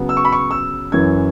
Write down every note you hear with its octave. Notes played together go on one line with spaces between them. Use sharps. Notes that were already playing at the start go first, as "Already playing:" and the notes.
Already playing: C#3 F#3 B3
E6
C#6
B5
C#6
E6
F#2 E3 C#4 G#6